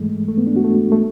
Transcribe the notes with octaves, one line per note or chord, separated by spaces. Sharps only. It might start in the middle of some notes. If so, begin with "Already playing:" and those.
Already playing: G#2 E3 G#3 A3
A3
B3
D4
F#4
A3
A3